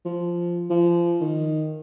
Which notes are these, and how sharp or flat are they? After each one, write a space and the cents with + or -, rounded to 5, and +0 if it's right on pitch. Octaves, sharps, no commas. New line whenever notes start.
F3 -5
F3 -25
D#3 -5